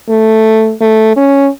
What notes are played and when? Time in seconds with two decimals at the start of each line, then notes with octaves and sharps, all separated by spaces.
0.10 A3
0.81 A3
1.17 C#4